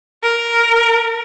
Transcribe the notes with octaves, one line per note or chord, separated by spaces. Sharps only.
A#4